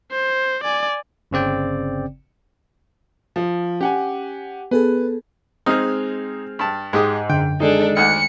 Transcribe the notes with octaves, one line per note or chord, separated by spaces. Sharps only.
C5
D5 G#5
G1 C#3 C4 D5 G5
F3
C#4 G4 F#5 G#5
B3 G#4 A4 B4
G#3 C4 D#4 G#4 F6
G2 A5
G#2 G#3 G4 D#6
F#2 D3 G5
D#3 G#3 D4 D#4 G#4 A4
D2 D3 F#5 C#7